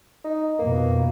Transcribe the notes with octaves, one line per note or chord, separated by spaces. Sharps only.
D#4
F2 B2 A#3